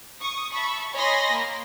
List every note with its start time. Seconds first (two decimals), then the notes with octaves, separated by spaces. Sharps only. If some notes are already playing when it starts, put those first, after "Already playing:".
0.21 C#6 D#6
0.52 E5 A5 B5 C#6
0.93 C#5 D#5 G#5 B5 C6 A#6
1.32 A#3